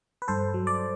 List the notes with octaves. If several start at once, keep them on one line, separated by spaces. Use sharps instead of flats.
B4
G2 A4 C5
F#3
D5